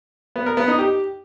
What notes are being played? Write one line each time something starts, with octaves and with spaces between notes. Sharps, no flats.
B3
A#4
B3
D#4
G4